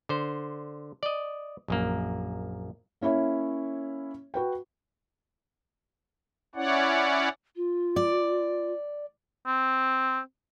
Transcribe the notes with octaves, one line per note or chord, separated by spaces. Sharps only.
D3 C5
D5 D#5
A#1 F#2 A#3
A#3 C#4 E4 C#5 E5
F#4 B4 G5
C#4 E4 C#5 D5 F#5
F4
D5
C4